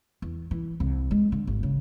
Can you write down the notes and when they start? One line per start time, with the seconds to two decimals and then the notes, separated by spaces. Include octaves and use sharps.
0.22 E2
0.51 E3
0.80 C2
1.11 G#3
1.32 D3
1.47 G#1
1.63 C#3